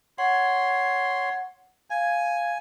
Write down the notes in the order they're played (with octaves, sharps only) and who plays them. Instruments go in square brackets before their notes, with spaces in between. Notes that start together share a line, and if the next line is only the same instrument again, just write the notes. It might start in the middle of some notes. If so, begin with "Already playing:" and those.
[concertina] C#5 C6 [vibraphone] F#5
[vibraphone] F5 [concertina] G#5